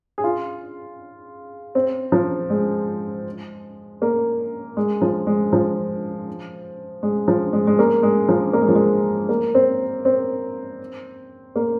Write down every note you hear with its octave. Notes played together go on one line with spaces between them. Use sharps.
G#4
F4
C4
F3
G#3
A#3
G#3
F3
G#3
F3
G#3
F3
G#3
G#3
A#3
G#3
F3
A#3
G#3
F3
G#3
A#3
C4
C4
A#3